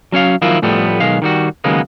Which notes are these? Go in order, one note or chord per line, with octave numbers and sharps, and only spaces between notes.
F#3 C#4 C#5 F5
D#3 F3 F#3 A#3 E4 F4
A2 F3 G3 A3 B3
B1 D#3 G#3 F5
D#3 G3 F#4
D#2 C#3 F#3 G#3 A#3 B3